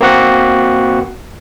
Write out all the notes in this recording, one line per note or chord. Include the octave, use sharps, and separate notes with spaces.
A#3 C4 F#4 F#5